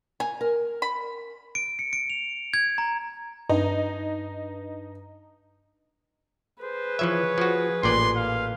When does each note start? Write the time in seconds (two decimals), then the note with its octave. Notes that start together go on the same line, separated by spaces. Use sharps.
0.20 G#5 A#5
0.41 A#4
0.82 B5
1.55 D7
1.79 C#7
1.93 D7
2.10 F7
2.54 G#6
2.78 A#5
3.50 G2 D#4
6.63 G#4 B4 C5
6.99 E3 F3 C#5 E5
7.38 F3 F#4
7.83 A1 A#2 D5 C6
8.17 F5